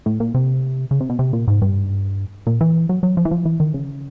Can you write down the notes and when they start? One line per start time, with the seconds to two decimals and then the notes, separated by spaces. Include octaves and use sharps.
0.06 A2
0.20 A#2
0.34 C3
0.91 C#3
1.01 C3
1.10 B2
1.19 C3
1.33 A#2
1.48 G#2
1.62 G2
2.47 A#2
2.61 E3
2.89 F#3
3.03 F#3
3.17 F3
3.25 E3
3.31 F3
3.45 E3
3.60 D#3
3.74 C#3